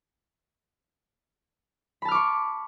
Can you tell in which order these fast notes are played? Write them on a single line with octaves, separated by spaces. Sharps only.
B5 A5 F6 D6 C#6